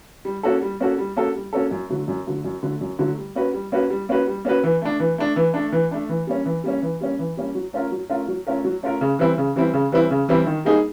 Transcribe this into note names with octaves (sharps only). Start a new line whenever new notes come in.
G3
A#3 C#4 F#4 A4
G3
A#3 C#4 F#4 A4
G3
A#3 C#4 F#4 A4
G3
A#3 C#4 F#4 A4
F#2
D3 F#3 A3
F#2
D3 F#3 A3
F#2
D3 F#3 A3
F#2
D3 F#3 A3
G3
A#3 C#4 F#4 B4
G3
A#3 C#4 F#4 B4
G3
A#3 C#4 F#4 B4
G3
A#3 C#4 F#4 B4
E3
A3 D4
E3
A3 D4
E3
A3 D4
E3
A3 D4
E3
G3 A#3 C#4
E3
G3 A#3 C#4
E3
G3 A#3 C#4
E3
G3 A#3 C#4
F#3
A3 C#4 F4 A#4
F#3
A3 C#4 F4 A#4
F#3
A3 C#4 F4 A#4
F#3
A3 C#4 F4 A#4
C#3
E3 G3 C4 E4
C#3
E3 G3 C4 E4
C#3
E3 G3 C4 E4
C#3
E3 G3 C4 E4
D#3
G3 A#3 D#4 G#4